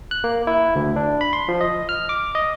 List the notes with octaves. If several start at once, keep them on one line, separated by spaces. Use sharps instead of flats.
F#6
A#3
E4
D2
D4
B5
C6
F3
D#5
F6
D6
D#5